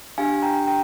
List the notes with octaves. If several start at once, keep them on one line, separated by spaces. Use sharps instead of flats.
D4 G4 F5 G#5
G5 A#5
G5 A#5